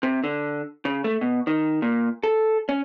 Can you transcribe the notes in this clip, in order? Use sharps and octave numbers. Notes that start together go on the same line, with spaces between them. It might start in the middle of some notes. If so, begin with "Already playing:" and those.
C3
D3
C#3
A3
B2
D#3
A#2
A4
C#4